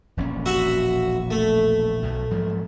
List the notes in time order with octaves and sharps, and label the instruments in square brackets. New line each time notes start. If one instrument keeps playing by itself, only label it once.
[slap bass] E1 A#1 C#4
[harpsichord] F#4 E5 F#5
A3
[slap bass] B1 B2
G#2 F3 F#3